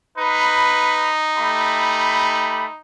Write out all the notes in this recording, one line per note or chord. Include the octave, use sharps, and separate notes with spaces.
D#4 B4 B5
A3 G4 B5